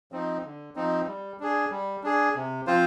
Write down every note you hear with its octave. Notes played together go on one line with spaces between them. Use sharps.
F3 C4 D#4
D3
F3 C4 D#4
G3
D4 G#4
G3
D4 G#4
C3
F3 C4 F4 C5